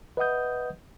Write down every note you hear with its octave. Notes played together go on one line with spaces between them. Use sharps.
B4 D#5 E5 F#5 D#6 G6